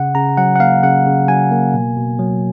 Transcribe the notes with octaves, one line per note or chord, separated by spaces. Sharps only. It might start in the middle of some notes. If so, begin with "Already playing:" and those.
Already playing: C#3 F#5
C#3 A#5
F#3 F#5
F#5
A#3 F5
C#3 F#5
C#3
F#3 G#5
A#3
B2
B2
F#3